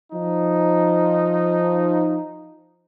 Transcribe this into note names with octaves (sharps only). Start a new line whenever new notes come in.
F3 D#4